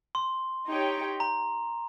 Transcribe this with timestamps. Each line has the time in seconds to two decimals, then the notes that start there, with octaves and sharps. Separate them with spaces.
0.15 C6
0.68 D#4 G4 C#5 G5
1.20 A#5